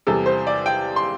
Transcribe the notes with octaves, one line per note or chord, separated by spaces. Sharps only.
E2 C3 G3 A4
C5
D5
G5
C6